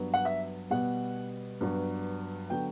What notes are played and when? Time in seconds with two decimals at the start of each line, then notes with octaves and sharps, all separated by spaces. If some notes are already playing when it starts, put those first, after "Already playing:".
Already playing: G2 F#3 B3
0.14 F#5
0.25 E5
0.70 B2 G3 B3 F#5
1.61 G2 F#3 B3
2.50 D3 F#3 B3 G5